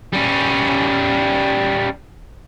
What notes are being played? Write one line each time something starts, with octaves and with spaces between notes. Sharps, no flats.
G3 C#4